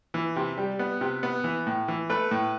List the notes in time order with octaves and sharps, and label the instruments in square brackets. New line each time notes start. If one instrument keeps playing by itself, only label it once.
[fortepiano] E3
C3
G3
B3
C3
B3
E3
A2
E3
A3 B4
A2